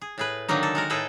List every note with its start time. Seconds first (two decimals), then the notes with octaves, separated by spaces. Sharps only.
0.01 G#4
0.18 A2 G#4 B4
0.48 D3 D#3 F#3 A#3 D#4
0.63 A4
0.75 G#3 F#4 A#4
0.90 A2 G#4 A4 B4 G5